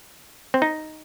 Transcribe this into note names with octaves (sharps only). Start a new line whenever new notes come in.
C4
D#4